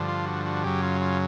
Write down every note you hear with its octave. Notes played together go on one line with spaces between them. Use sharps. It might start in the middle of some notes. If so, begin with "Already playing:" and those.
Already playing: G2 D3 F3
F4
F#4
F#4
F#2 C#3 F#3 G4
F4
F4